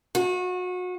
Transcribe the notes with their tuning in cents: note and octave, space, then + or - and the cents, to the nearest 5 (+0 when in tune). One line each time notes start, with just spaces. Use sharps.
F#4 -30